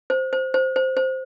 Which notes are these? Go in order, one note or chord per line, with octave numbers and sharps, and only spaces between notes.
C5
C5
C5
C5
C5